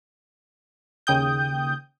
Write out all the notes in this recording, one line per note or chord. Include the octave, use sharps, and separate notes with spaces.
D#2 C#3 G5 D#6 G6